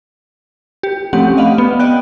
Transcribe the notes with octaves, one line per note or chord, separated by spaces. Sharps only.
G4
F3 A3 C4 C#4 G4 F#5
D5 D#5 F5 F#5 B5
B3
D5 D#5 G5 F#6